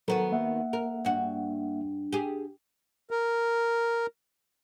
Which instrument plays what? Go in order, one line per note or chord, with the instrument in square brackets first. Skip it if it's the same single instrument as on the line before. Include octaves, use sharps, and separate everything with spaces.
[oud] D#3 B3 F#4 [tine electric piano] F#3 A4 A#5
[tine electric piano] A#3 E5 F#5
[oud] A#4
G2 F#4
G4 G#4
[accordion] A#4